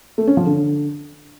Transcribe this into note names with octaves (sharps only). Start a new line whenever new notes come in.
A3
C#4
F3
D3